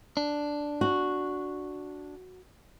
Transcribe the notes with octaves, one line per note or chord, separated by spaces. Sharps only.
D4
F#4